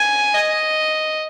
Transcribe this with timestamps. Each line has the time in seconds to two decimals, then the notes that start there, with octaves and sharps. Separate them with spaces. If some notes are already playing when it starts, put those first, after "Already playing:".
Already playing: G#5
0.35 D#5